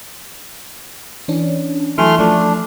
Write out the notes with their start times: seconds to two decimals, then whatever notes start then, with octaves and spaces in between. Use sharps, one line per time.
1.28 E3 C#4 D4
1.98 E3 F#3 A3 G#5 C6 F6
2.18 F3 A3 D4